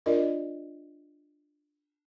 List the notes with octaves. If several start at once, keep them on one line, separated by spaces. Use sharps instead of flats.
D4 F4 A#4 D5 D#5